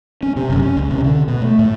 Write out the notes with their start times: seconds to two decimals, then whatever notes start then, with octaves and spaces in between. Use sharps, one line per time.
0.23 C#4
0.36 C3
0.50 F#1
0.62 C#4
0.77 C#2
0.91 C3
1.04 D3
1.28 B2
1.42 A3
1.59 A2